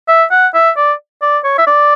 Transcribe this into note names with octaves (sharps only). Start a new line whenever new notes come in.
E5
F#5
E5
D5
D5
C#5
E5
D5